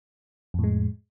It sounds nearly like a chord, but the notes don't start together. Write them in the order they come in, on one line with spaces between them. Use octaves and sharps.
F2 A2 G#3